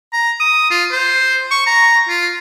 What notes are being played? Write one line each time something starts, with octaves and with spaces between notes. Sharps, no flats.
A#5
D#6
F4
C5
C#6
A#5
F4